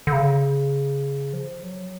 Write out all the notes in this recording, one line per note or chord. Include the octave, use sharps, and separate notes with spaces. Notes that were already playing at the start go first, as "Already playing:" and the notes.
D3
C#3
F3
F#3